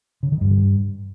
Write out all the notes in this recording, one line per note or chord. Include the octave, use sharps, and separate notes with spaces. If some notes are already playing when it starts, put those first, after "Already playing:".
C#3
D#3
G2